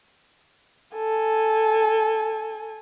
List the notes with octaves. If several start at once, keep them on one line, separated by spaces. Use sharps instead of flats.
A4 G#5